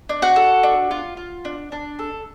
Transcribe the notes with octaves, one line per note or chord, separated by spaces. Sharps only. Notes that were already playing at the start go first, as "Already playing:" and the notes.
D4
F#4 F#5
A4
D4
F4
F4
D4
D4
A4